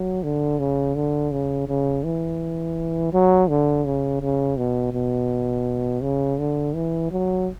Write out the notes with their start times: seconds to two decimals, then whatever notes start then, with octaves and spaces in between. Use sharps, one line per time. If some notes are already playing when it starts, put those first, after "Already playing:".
Already playing: F#3
0.23 D3
0.59 C#3
0.95 D3
1.32 C#3
1.68 C#3
2.04 E3
3.13 F#3
3.49 D3
3.85 C#3
4.22 C#3
4.57 B2
4.93 B2
6.02 C#3
6.40 D3
6.75 E3
7.11 F#3